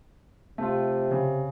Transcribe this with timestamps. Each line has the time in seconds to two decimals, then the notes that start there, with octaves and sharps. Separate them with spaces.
0.58 C3 A3 F4
1.11 C#3